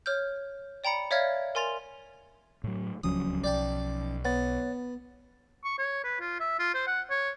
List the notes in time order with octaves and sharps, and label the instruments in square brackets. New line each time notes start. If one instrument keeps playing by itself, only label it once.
[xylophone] C#5 F6 G6
D5 G5 A#5 B5 C#7
C#5 D5 E5 F5 F6 G#6
A#4 G#5 C6 A6 F7
[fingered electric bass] A2 F#3
[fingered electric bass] D1 C#2 F#3 [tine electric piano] F3 C#4 [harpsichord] D#6
[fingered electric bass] B1 [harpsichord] D5 G5 A5
[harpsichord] B3 [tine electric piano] C#5 F#5 A6
[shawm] C#6
C#5
B4
F4
E5
F4
C5
F#5
C#5